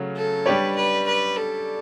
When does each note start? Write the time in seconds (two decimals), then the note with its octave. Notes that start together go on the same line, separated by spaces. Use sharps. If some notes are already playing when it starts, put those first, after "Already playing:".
Already playing: C#3 F#3 A3 C#4
0.16 A4
0.46 G3 D4 G4 B4 C#5
0.76 B4
1.06 B4
1.37 A4